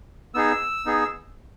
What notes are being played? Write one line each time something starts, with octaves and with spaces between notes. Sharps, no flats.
B3 D#4 G#4 E6
B3 D#4 G#4